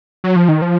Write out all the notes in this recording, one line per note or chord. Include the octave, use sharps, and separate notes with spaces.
F#3
F3
D#3
F3